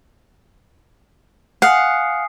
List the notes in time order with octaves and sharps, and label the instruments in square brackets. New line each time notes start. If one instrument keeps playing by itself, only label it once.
[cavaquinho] F5 F#5 [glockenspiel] G#5 D#6 C7